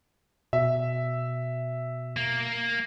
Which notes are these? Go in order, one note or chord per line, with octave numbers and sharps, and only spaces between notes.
B2 E5
A#3